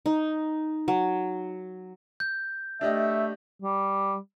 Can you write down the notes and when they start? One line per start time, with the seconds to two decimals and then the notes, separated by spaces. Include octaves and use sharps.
0.06 D#4
0.88 F#3
2.20 G6
2.81 A3 D4 G4 D#5 E5
3.62 G3